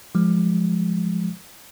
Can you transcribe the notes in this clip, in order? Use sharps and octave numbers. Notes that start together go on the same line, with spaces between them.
F3 G#3